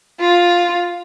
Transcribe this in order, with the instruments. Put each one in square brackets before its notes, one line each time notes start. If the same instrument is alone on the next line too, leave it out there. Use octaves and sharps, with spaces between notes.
[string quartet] F4